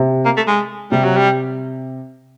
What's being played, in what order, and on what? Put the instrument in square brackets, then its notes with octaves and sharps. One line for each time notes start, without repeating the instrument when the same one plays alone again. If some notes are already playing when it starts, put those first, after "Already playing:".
Already playing: [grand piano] C3
[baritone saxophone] A#3
A3
G#3
[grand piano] C3 [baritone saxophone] G3
[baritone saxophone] F#3
G3